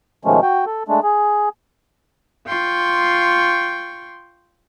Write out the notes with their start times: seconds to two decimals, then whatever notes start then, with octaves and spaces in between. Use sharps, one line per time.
0.25 B2 D#3 F3 G#3 A3 C#4
0.42 F#4 G5
0.66 A4
0.88 G#3 A3 D4
1.03 G#4
2.47 F4 G5 C6 C#6